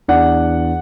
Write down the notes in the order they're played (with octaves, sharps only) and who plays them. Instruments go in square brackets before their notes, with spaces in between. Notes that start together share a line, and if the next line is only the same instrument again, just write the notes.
[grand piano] E2 E3 D4 D5 F#5